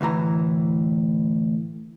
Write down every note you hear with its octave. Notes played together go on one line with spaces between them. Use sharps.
D2 A2 E3 A#5